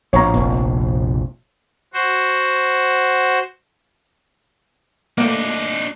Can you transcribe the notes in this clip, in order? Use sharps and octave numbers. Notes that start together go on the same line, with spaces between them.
A#1 A2 C#5 A#5
F1 A#1
F#4 C5
A3 A#3 D4 D#4